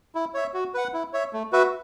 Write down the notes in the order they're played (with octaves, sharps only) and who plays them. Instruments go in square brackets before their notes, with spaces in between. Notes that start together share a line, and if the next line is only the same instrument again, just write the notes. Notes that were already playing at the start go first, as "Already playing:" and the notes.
[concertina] E4
C#5 E5
F#4
B4 F#5
E4
C#5 E5
A3
F#4 B4 E5